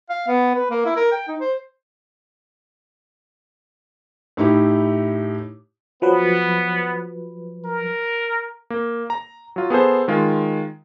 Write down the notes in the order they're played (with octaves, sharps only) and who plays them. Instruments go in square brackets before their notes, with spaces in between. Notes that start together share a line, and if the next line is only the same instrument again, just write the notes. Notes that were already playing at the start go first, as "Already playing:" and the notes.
[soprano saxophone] F5
B3
B4
A#3
E4
A#4
G5
D#4
C5
[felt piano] A2 D#4 E4 G4
[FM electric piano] F3 F#3 B4 [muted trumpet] B3
[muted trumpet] A#4
[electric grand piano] A#3
A#5
F#3 F4
B3 G#4 A4 C5
D#3 G#3 F4